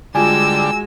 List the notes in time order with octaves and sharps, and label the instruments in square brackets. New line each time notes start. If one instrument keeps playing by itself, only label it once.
[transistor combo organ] D3 G3 [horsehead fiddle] G#3 F#4 [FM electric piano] F4 G#5 [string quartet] E6